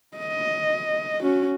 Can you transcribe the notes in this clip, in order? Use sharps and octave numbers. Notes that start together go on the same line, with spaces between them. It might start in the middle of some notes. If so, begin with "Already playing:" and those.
D#5
C#4 F#4